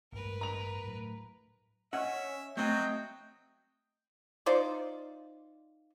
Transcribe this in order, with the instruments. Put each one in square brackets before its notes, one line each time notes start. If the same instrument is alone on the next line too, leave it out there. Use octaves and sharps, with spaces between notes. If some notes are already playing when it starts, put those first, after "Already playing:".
[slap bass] A1 G2 G#3 [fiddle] A#4 B4
[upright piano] A#5 F7
[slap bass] A2 F#3 A3
[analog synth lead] C#4 [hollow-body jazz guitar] D#5 F#5 [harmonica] E5
[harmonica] F#3 [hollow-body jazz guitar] A3 C4 [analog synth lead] D#5 [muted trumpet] G5
[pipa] D#4 F4 C5 D5